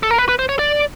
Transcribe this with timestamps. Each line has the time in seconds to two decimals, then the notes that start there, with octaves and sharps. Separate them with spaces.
0.03 A4
0.11 A#4
0.18 B4
0.29 B4
0.39 C5
0.49 C#5
0.59 D5